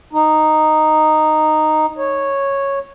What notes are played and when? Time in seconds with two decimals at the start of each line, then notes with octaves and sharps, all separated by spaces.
0.13 D#4
1.98 C#5